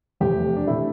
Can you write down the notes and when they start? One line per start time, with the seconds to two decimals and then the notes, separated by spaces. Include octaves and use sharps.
0.20 F1 E2 C3 E3 A3 G4
0.56 D4
0.67 C3 E3 A3 E4